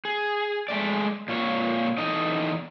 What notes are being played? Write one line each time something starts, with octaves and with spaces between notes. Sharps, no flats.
G#4
G#3 A3 D5
A#2 F4 C#5
E2 D#4 A4 D#5